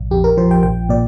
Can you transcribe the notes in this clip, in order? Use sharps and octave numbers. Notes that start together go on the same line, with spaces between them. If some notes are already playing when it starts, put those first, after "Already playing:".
Already playing: A#1
F2 G4
A#4
F3 C5
G5
A#1 G5
A#2 D5